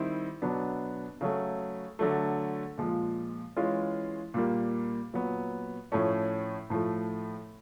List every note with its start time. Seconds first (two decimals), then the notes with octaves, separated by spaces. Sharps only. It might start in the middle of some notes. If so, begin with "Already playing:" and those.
Already playing: D#3 G3 C4 E4
0.42 B2 F#3 B3 D4
1.21 C#3 F#3 A3
1.99 D3 F#3 A3
2.78 A#2 F3 G#3
3.56 E3 G#3 C#4 F4
4.34 A#2 G3 A#3
5.13 A#2 F#3 B3
5.92 A2 F3 A3 C#4
6.70 A2 F3 A3